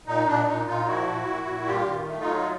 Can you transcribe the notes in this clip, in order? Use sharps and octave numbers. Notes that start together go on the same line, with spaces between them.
A#2 D#4
A#2 D4
A#2 D#4
A#2 D#4 F4
F3 E4 F#4
A#2
A#2
A#2
G2 F4 G4
D#3
A3
D#4 F4
F#3